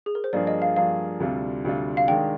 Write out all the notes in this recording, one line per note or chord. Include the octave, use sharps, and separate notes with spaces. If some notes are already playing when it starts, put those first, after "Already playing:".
G#4
A#4
C5
G2 F3 A#3 D4 G#4 D5
D#5
F5
G2 F3 A#3 D4 G#4 F5
D2 C3 G3 D4 F4
D2 C3 G3 D4 F4
F5
D#3 G#3 D4 G5